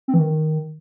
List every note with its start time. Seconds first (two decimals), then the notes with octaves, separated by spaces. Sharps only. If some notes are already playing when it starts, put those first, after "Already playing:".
0.08 C4
0.14 E3
0.19 D#3